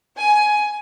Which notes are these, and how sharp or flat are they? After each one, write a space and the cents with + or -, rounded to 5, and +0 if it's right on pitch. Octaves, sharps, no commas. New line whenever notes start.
G#5 +15